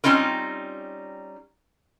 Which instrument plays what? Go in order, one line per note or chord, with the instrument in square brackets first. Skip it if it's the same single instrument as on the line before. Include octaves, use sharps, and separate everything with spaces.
[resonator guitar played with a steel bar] G3 C4 C#4 D#4 F4 A#4